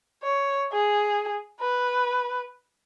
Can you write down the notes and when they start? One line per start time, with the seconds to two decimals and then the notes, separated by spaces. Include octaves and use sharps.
0.23 C#5
0.72 G#4
1.61 B4